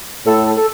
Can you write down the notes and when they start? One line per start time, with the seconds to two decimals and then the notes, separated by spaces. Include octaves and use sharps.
0.26 A2 A4
0.57 A4